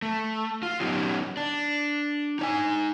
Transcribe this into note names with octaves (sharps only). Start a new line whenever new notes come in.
A3
F4
F#3 B3 C#4 D#4 G4
D4
D#4 C#5 G#5